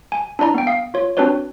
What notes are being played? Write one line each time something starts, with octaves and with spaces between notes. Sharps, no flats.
G#5
D4 E4 D5 A#5
B3 G5
F5 D#6
F4 C#5
C4 D4 F#4 B4 C#5 D5